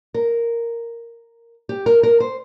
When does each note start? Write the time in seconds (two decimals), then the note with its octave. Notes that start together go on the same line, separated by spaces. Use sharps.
0.14 A#4
1.69 G4
1.86 A#4
2.03 A#4
2.20 C5